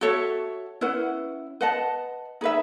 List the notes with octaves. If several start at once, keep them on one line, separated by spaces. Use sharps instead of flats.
F#4 A4 C#5 E5
C#4 E4 B4 F#5
B4 D#5 F#5 A5
D#4 G#4 B4 E5